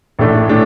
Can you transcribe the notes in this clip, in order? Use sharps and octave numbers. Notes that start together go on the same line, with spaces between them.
A1 A2 A3 D4
A2 A3 D4